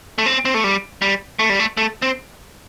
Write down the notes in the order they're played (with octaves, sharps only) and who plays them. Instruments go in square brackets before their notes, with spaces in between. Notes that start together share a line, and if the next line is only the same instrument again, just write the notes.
[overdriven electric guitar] A3
C4
C4
A3
G3
G3
A3
G3
A3
A3
C4